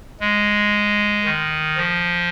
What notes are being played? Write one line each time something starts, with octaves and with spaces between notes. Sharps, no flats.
G#3
D#3
F3